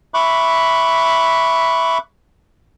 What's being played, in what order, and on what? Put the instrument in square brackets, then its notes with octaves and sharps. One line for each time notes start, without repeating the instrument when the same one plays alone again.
[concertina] E5 B5 C#6 D6 F#6